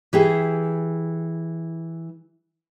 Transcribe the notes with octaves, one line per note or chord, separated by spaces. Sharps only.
E3 G4 G#4